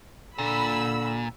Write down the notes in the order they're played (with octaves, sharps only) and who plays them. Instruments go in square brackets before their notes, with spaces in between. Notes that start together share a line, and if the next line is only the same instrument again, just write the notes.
[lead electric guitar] A#2 [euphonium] D3 [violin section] B5 E6